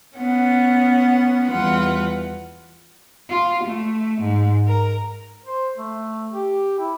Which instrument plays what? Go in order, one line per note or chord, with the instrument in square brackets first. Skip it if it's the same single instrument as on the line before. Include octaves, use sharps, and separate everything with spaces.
[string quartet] B3 C#4 F#5
E2 E3 G3 F4 B4 F#5
F4
A3
G#2
A#4
[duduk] C5
A3
G4
E4